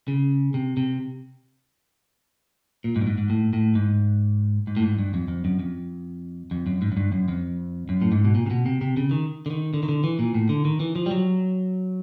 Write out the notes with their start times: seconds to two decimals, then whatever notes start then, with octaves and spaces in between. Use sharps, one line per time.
0.08 C#3
0.54 C3
0.77 C3
2.84 A#2
2.96 G#2
3.01 G2
3.07 G#2
3.18 G#2
3.30 A2
3.53 A2
3.75 G#2
4.67 G#2
4.77 A2
4.82 G#2
4.99 G2
5.14 F2
5.28 F2
5.45 F#2
5.59 F2
6.51 F2
6.67 F#2
6.82 G#2
6.92 F#2
6.97 G2
7.12 F#2
7.28 F2
7.89 F#2
8.02 A2
8.12 G#2
8.25 B2
8.35 A#2
8.46 C3
8.50 B2
8.66 C3
8.81 C3
8.97 C#3
9.11 D#3
9.46 D3
9.50 D#3
9.74 D3
9.83 D#3
9.89 D3
10.04 E3
10.19 A#2
10.34 A2
10.49 D3
10.65 D#3
10.80 E3
10.96 F3
11.06 G3
11.11 F#3